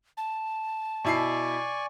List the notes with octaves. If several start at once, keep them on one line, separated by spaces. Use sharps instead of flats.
A5
B2 E4 D5 G#5 C#6 C7